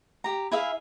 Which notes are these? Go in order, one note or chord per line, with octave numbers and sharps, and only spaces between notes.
G4 A#5
E4 G#4 E5 F5